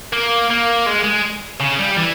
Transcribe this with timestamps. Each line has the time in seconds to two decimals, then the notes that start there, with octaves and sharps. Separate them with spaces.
0.13 A#3
0.50 A#3
0.86 G#3
1.04 G#3
1.60 C#3
1.78 G3
1.97 E3